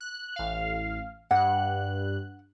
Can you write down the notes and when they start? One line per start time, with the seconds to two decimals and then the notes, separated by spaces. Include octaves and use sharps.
0.01 F#6
0.36 A1 F5
1.31 G2 F#5 F#6